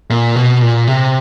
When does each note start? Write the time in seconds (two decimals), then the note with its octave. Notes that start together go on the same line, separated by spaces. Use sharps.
0.10 A#2
0.36 B2
0.62 A#2
0.87 C3